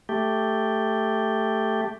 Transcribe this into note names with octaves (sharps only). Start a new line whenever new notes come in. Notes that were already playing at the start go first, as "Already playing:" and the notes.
A3 G4